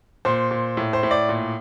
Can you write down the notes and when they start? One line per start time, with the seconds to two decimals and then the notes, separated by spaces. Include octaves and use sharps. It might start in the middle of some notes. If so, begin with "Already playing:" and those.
0.25 A#2 C5
0.51 A#2
0.77 A2
0.93 C5
1.03 A2
1.11 D5
1.29 A#2